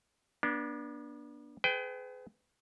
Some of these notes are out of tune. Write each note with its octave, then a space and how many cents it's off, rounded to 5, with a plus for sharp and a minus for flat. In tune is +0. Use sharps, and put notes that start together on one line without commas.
B3 -40 D4 +0
G#4 +25 B4 +40 G5 +0